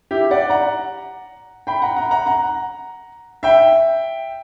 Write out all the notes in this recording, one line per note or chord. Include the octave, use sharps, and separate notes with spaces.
E4 G4
D5 F#5
F#5 A#5
G5 B5
F#5 A#5
F#5 A#5
F#5 A#5
F#5 A#5
E5 G5